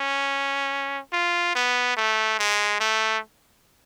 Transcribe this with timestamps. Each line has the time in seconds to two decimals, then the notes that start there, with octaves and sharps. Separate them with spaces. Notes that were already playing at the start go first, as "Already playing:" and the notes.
Already playing: C#4
1.13 F4
1.55 B3
1.97 A3
2.39 G#3
2.80 A3